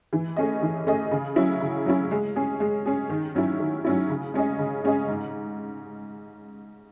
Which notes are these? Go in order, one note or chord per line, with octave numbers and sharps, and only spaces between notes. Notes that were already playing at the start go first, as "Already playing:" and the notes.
E3
A3 C#4 G#4 D#5
E3
A3 C#4 G#4 D#5
C#3
F#3 C#4 E4
C#3
F#3 C#4 E4
G#3
C#4 G#4
G#3
C#4 G#4
D#3
F#3 C#4 E4
D#3
F#3 C#4 E4
C#3
G#3 C#4 G#4 D#5
C#3
G#3 C#4 G#4 D#5
G#2